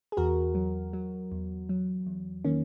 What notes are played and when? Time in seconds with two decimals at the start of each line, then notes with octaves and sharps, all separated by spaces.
0.12 G#4
0.17 E2 F#4 A#4
0.55 F#3
0.93 F#3
1.32 E2
1.69 F#3
2.06 E2
2.45 D#3 A#3 C#4